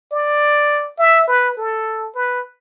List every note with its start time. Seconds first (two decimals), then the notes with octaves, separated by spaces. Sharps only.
0.12 D5
0.99 E5
1.28 B4
1.57 A4
2.15 B4